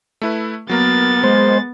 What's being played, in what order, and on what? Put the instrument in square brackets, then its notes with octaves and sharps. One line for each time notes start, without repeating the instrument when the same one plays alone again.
[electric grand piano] A3 E4 B4
[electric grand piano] F#3 A#3 A#4 [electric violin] B3 A6
[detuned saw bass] G#3 [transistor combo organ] C5